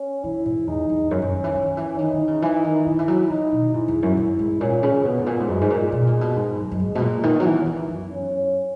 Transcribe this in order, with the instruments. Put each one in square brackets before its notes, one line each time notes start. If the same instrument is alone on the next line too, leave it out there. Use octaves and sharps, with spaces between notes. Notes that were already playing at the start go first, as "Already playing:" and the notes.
Already playing: [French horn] C#4
[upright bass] E3 [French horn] E4
[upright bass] G#2
[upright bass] E2 [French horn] D#4
[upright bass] E2
[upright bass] F#2 [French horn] C#4
[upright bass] F#2
D#3
E3
D#3
E3
[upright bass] D#3 [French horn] D#4
[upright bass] D#3
C#3
E3
D#3
[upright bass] D#3 [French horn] E4
[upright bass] E3
F#3
[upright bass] D#3 [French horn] D#4
[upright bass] B2
[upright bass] G#2 [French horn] E4
[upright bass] E2
F#2
F#2
G#2
[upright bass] A#2 [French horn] C#4
[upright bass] C#3
[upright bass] B2 [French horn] B3
[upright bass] G#2
A#2
G#2
[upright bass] F#2 [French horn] G#3
[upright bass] G#2
A#2
B2
A#2
B2
G#2
F#2
F#2
[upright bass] G#2 [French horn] G#3
[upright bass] B2
A#2
[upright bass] D#3 [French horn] B3
[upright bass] F#3
E3
E3
F#2
[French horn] C#4